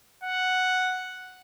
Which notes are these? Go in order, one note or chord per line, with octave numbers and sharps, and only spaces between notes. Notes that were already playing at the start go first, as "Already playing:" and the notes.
F#5